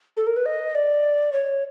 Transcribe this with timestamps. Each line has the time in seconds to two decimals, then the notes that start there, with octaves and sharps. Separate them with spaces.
0.17 A4
0.27 A#4
0.36 B4
0.46 D#5
0.75 D5
1.33 C#5